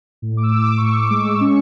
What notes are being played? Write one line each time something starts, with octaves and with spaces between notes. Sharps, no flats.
A2
D6
E6
A2
D6
C#6
A2 D6
D6
G#3
E6
C#4 C#6